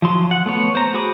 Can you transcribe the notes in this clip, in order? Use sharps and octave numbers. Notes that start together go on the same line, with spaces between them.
F3 F#3 C6
F#5
A3 B3 C#5
C5 A#5
F#4 G#4 B5 D6 D#6